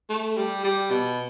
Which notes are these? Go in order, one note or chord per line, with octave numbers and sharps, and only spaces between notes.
A3
G3
G3
B2